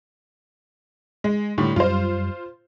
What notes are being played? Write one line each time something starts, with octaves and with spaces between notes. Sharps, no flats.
G#3
A2 D3 G3
F#2 G3 F4 C5